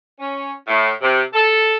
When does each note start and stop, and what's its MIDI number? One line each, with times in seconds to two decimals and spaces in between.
0.20 0.52 61
0.67 0.90 45
1.02 1.22 48
1.34 1.76 69